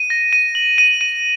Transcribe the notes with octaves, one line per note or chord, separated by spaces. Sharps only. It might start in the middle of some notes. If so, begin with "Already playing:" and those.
Already playing: D#7
A#6
D#7
F#7
D#7
D#7